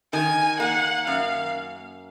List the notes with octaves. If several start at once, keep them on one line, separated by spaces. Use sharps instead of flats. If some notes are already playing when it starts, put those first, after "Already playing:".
D#3 G#5
A#3 F#5
F#2 F5